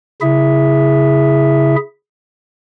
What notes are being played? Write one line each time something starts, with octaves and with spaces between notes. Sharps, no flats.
C#3 E4 G#4 E5